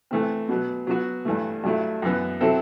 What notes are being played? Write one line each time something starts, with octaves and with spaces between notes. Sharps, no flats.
E3 A3 C4
B2 F#3 B3
F#3 B3 F#4
G2 E3 A3
G2 F#3 A3 E4
F#2 E3 B3
F#3 C4 E4 A4